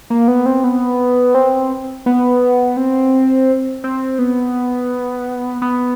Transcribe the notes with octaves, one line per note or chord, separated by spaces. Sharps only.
A#3
B3
C4
B3
C4
B3
C4
C4
B3
B3